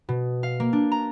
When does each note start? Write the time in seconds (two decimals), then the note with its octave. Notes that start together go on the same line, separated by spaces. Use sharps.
0.09 B2
0.43 F5
0.60 A#3
0.73 D4
0.92 A#5